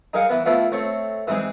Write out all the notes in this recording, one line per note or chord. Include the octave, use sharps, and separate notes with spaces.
D#4 G#4 A#4 D#5 F5 F#5
E3 B3
F3 A3 B3 E4 F4
A3 C4 C#5
E3 G#3 C4 D#4 G#4